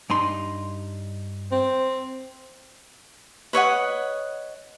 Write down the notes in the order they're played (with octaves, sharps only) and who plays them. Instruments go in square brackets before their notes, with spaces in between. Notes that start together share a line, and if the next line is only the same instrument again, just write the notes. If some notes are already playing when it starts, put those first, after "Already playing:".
[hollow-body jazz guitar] G2 D#4 C6
[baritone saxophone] C4
[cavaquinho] B4 C#5 D#5 F#5